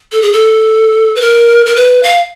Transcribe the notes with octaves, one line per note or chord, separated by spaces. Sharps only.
A4
G#4
A4
B4
A#4
A#4
B4
F5